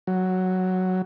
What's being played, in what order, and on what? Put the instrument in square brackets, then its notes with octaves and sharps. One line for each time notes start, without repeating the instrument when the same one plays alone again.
[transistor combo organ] F#3